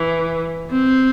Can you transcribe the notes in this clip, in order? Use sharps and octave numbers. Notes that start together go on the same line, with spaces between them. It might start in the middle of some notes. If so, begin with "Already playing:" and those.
Already playing: E3
C4